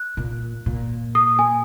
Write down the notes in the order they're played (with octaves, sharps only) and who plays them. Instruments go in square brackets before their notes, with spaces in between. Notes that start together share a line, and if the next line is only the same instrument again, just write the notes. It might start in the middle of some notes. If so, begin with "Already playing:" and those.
Already playing: [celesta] F#6
[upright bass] A#2
A#2
[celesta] D#6
G#5